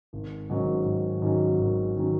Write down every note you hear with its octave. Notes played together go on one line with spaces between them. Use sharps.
G#1
G#2 D#3 F#3 C#4
G#1
G#2 D#3 F#3 C#4
G#1
D#3 F#3 C#4